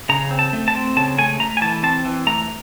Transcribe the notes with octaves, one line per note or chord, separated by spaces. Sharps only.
C#3 A#5
C4
A5
A3
A5
C4
C#3 A5
A3 G#5
A3 A#5
G#5
E3 A5
C4 A5
E3
A3 A#5